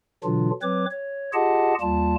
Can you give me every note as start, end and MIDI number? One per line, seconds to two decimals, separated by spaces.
0.24 0.50 47
0.24 0.50 50
0.24 0.50 52
0.24 0.50 54
0.24 0.50 62
0.24 0.50 65
0.62 0.86 54
0.62 0.86 60
0.62 0.86 71
0.62 0.86 73
0.62 0.86 86
0.91 1.31 73
1.33 1.74 65
1.33 1.74 67
1.33 1.74 68
1.33 1.74 75
1.33 1.74 78
1.33 1.74 81
1.81 2.15 39
1.81 2.15 55
1.81 2.15 58
1.81 2.15 65
1.81 2.15 81